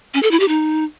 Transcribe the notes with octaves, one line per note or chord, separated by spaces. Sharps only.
C#4
A4
E4
G4
D#4